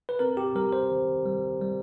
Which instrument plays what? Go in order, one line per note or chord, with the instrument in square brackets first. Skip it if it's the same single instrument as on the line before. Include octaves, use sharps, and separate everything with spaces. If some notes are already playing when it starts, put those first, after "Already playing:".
[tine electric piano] B4
C4 A#4
G4
G3 A#4
C5
D#3
G3
G3